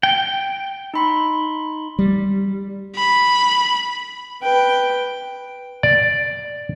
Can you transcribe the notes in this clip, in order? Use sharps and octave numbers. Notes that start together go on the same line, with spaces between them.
G5
D#4 B5 C6
G3
B5
B4 G5
D5